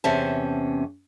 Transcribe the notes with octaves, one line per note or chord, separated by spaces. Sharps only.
E2 C3 C#4 C5 E5 A5